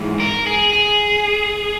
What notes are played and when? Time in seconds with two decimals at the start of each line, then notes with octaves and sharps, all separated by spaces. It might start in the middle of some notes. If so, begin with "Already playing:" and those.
Already playing: G#2 E3
0.20 A#4
0.47 G#4
0.73 G#4